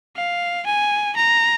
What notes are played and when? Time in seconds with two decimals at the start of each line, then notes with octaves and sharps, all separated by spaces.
0.16 F5
0.66 G#5
1.16 A#5